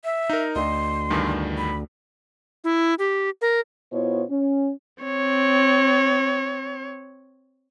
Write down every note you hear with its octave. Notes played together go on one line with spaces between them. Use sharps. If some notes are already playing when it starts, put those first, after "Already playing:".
E5
D#4 A#4
D2 D#5 C6
E2 G2 D#3
B5
E4
G4
A#4
B2 B3 E4 F4 C5 C#5
C#4
C4 C#5